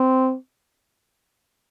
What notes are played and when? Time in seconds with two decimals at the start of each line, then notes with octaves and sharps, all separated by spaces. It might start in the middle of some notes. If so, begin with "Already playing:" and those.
Already playing: C4